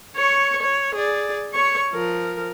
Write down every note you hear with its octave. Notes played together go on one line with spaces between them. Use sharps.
C#5 C#6
C#5
G#4 D5
C#5 C#6
F3 A#4